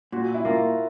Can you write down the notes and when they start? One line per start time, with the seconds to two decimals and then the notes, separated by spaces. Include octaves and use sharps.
0.12 A#2 F#4
0.34 E4
0.45 A#3 F4